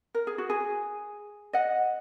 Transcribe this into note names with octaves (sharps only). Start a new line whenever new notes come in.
A#4
G#4
F#4
G#4
D#5 F#5